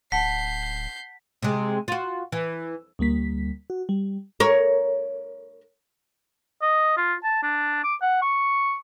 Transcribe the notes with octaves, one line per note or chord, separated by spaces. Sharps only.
D1 F#5 A5 G6 B6 C7
C3 G#3
F4 F#4
E3
D2 G3 A#3 B6
F#4
G3
A#4 C#5
D#5
F4
A5
D4
D6
F#5
C#6